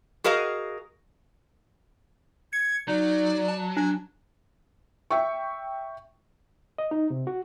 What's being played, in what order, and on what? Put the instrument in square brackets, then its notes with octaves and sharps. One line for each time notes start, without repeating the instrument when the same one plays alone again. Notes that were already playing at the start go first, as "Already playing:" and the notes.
[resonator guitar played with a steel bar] F#4 G#4 A#4 D#5 F5
[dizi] G#6 [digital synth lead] C#7
[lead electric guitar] F#3 [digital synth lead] D#4 [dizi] D5
[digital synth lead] A5
[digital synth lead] D4 [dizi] G#5
[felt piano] E5 G5 C#6
[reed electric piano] D#5
D#4
C3
F#4